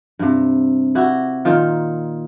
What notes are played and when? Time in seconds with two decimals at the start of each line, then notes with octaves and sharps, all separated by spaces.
0.19 G2 C3
0.95 E4 F#4 G4
1.45 A#2 D#3 F4